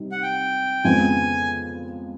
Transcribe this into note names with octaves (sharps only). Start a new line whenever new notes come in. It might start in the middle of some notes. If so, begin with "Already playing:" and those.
Already playing: C3 G3 D#4
F#5
G5
F2 C#3 F3 G#3 B3 G#5